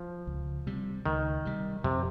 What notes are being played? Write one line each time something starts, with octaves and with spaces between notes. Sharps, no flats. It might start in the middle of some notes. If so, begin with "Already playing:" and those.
Already playing: F3
C#2
C3 G3
C#2 D#3
C3 G3
F2 C3